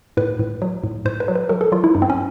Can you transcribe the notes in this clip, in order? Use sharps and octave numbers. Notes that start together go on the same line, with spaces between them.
A2 B4
A2
F#3
A2
A2 C5
B4
F#3
B4
F#3 A#4
A4
F#3 F4
E4
G2 D#4
C4
C#4